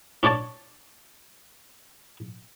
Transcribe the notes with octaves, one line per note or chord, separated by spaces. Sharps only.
C#4 D4 C#5 D5 A5